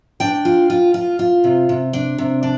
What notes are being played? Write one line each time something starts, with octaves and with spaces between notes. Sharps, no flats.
D4 G5
F4
F4
F4
F4
C3
C3
D4
C3
D4